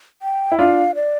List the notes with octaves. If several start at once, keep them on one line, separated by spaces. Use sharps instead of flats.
G5
E4
D4 F4 F5
D5